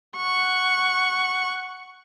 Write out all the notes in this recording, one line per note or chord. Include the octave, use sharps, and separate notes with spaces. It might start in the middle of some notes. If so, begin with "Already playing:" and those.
F#5 C#6